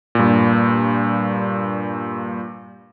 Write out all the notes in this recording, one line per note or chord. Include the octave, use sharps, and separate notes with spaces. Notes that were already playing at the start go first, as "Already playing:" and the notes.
G2 A#2